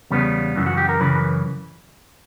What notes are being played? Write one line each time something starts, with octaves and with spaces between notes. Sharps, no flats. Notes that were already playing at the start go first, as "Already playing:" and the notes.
E2 C#3 G3 B3
F#2 C#3 E3
F#4
G4
A#4
F#2 C#3 E3 B4